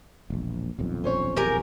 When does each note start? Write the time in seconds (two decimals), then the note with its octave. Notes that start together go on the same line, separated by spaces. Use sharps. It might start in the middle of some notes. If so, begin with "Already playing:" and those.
0.30 E1 A#1
0.79 D#1 B1 F2
1.04 C#4 C5 C#5
1.37 E3 G4 G#4 A#4 G#5